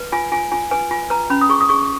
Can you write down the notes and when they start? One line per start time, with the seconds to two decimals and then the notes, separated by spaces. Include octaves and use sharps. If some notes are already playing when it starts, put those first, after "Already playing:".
Already playing: B4
0.12 F4 G#5
0.32 F4 G#5
0.51 F4 G#5
0.71 B4 G#5
0.91 F4 G#5
1.10 B4 A#5
1.30 C#4 B5
1.41 D#6
1.50 G#4 C#6
1.61 D#6
1.69 G#4 C#6